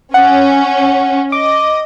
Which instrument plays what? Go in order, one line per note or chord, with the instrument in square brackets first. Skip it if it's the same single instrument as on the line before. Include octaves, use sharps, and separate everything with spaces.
[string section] C#4 [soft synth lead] F#5
[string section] D#5 [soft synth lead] D6